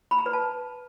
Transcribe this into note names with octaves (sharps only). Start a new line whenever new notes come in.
B5
A#5
B4
A5